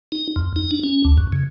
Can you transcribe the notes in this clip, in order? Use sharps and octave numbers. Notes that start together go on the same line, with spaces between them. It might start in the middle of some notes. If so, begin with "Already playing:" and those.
D#4
F2
D#4
D4
C#4
D2
F#2
C#3